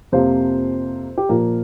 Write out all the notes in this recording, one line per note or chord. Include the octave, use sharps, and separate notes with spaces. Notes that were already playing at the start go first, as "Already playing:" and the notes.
F2 C3 F3 A#3 C5
G4
A#2 F3 A#3 A#4